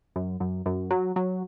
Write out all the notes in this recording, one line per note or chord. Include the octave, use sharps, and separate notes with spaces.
F#2
F#2
F#2
F#3
F#3